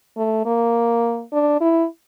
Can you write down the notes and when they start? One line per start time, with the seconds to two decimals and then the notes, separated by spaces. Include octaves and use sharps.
0.17 A3
0.46 A#3
1.33 D4
1.61 E4